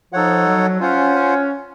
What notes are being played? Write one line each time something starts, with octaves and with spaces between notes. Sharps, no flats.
F3 D#4 A4 C#5 F#5
F#3
C#4 F4 C5 F#5
C#4